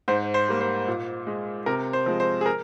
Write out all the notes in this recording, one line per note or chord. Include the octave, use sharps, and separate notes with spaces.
G#2 C5
C5
G3 A#3
C5
A#2
G#3
C3 A#4
C5
F3 G#3
C5
G#4
A#4